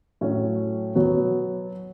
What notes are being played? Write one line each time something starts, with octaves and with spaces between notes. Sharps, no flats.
A2 F#3 C#4
B2 F#3 B3 F#4